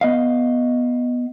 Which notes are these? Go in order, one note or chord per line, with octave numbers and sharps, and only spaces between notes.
B3 D#5 F5